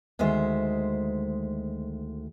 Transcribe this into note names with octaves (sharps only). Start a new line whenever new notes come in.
D2 D#3 G#3 C5 E5